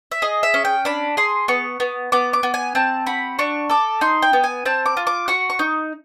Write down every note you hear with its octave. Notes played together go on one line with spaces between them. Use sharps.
E5
G#4 D#5
E5
C#4
G5
D4 B5
G#4 C6
B3 C#6
B3
B3 D6
D6
B3
G#5
C4 A5
F#4 B5
D4 C#6
A4 D6
D#4 C6
G5
B3
G#5
C4 A5
D6
F4
D6
F#4 C#6
C#6
D#4